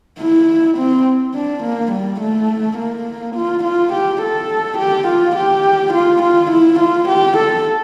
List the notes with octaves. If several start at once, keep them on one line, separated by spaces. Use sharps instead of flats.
E4
C4
D4
A#3
G3
A3
A#3
F4
F4
G4
A4
G4
F4
G4
F4
F4
E4
F4
G4
A4